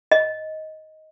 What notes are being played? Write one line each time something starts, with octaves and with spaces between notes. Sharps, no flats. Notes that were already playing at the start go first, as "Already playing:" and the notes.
D#5